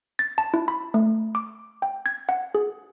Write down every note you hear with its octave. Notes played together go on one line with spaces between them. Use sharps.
A6
A5
E4
B5
A3
D6
G5
G#6
F#5
G#4